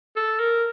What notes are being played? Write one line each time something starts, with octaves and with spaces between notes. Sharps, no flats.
A4
A#4